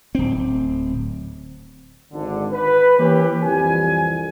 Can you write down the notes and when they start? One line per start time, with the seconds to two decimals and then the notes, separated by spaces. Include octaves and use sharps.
0.15 D1 C4
2.12 G#1 D3
2.52 B4
2.98 E3 A#3 C#4 G4
3.42 C2 F2 E3 G4 G#5